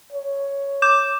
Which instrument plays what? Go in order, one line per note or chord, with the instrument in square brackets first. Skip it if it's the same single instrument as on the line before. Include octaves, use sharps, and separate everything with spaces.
[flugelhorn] C#5
[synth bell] D6 G6 E7